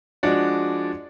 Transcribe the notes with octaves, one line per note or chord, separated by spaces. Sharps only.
F3 G#3 D4 F#4 D5